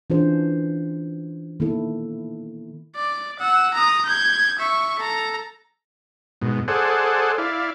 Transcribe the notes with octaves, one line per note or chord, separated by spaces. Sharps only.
E3 C#4 D4 F4 G#4 C5
D#3 A#3 B3 E4 A4
D5
F#5 E6
A#5 D#6
G6 G#6
E5 C#6
A4 A#5
G#2 B2
G#4 A4 C5 D5 F#5
E4 D5 F5